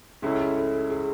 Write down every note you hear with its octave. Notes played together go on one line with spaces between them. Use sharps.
C#2 C#3 G#3 C#4 E4 A4
A4
A4
A4
G#4